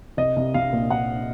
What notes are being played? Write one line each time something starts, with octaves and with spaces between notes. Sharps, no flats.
C2 D#5
C2
C2 F5
A#2
A#2 F#5